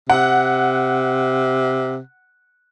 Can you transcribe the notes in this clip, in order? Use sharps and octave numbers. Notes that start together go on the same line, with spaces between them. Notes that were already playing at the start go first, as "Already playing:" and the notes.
C3 F#5